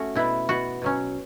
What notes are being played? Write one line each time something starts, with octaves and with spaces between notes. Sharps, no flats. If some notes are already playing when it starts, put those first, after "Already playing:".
Already playing: A3 C#4 F#4
B2 B3 E4
B2 B3 F#4
B2 F#3 C#4